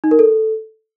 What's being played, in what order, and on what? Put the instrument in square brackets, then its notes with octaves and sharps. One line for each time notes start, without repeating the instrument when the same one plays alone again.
[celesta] D#4
A#4
A4